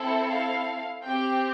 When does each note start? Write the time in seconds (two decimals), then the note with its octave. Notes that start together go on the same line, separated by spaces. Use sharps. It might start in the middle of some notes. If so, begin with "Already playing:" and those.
Already playing: C4 E4 A4
0.29 F5
1.03 C4 G4 G5